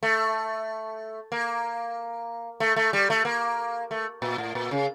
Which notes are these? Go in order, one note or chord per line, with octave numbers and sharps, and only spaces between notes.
A3
A#3
A3
A3
G3
A3
A#3
A3
A#2
A2
A#2
C#3